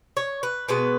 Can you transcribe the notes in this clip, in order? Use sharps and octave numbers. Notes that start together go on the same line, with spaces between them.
C#5
B4
B2 G#3 B3 B4